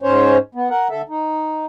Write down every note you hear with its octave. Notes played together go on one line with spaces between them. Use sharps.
G#2 C#4 C5 C#5
B3
A#4 F#5
D3 A4 E5
D#4